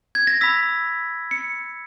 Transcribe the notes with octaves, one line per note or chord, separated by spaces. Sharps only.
G#6
A#6
B5 E6 B6
C#7